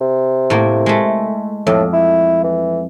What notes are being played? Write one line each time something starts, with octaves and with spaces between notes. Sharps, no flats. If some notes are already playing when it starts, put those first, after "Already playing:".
C3
A2 A#3
G#3 A3
F2 A2
E4
E3